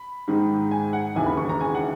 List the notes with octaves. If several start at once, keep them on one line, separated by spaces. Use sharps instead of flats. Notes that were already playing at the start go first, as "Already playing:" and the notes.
Already playing: B5
G#2 D#3 G#3 D#4
G#5
F#5
E1 D#2 C#3 E3 G#5
B5
C#6
A#5
G#5
F#5